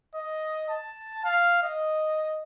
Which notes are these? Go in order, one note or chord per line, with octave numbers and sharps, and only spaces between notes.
D#5
A5
F5
D#5